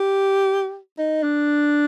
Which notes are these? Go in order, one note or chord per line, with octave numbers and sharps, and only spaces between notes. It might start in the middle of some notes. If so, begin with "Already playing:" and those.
Already playing: G4
D#4
D4